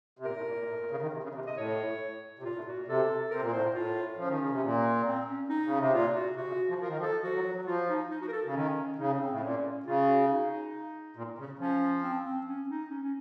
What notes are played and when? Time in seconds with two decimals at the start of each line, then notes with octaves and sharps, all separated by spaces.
0.19 C3
0.25 A#2 A#4
0.37 A2
0.48 A#2
0.59 A#2
0.70 A2
0.80 A#2
0.91 C#3
1.02 D#3
1.13 C3
1.23 C#3
1.35 C3
1.45 C3 D#5
1.56 A2 C#5
2.39 C3
2.43 A#2 F4
2.55 A2
2.66 A#2 F#4
2.76 A#2
2.88 C3 A4
3.31 C3 A#4
3.42 A#2
3.52 A2 C5
3.62 A#2
3.74 A2 F4
4.17 F3 C#4
4.28 D#3
4.39 C#3
4.50 C3
4.63 A#2
5.05 C4
5.27 C#4
5.49 D#4
5.65 C#3
5.79 C3
5.92 A#2 F4
6.15 F#4
6.36 C3 F#4
6.48 C#3
6.69 F3
6.79 F3 A#4
6.88 D#3
6.97 F3
7.02 A4
7.23 F3 F#4
7.35 F#3
7.46 F#3
7.56 F#3
7.67 F3 F4
7.88 D#4
8.11 D#4
8.21 F#4
8.28 A#4
8.32 A4
8.45 C#3
8.54 D#3 C#4
8.98 C#3 D#4
9.20 C4
9.30 A2
9.42 A#2 C#4
9.85 C#3 F4
10.07 F#4
10.29 D#4
11.16 A#2
11.39 C#3
11.59 F3 C#4
12.03 C4
12.25 C4
12.47 C#4
12.69 D#4
12.90 C#4
13.03 C#4